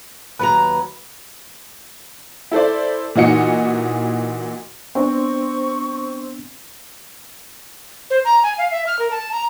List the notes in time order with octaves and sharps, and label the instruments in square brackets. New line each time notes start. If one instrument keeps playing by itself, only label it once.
[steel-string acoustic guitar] D#2 F#3 A#5 [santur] B4
[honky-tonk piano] E4 A4 C5 D5
A#2 E3 D#4 F#4 C#7
[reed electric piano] B3 D4 [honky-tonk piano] C4 [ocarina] C#6
[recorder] C5
A#5
G#5
F5
E5
F6
A#4
A5
A#5